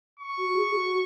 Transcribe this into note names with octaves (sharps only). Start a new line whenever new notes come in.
C#6
F#4
G#4
F#4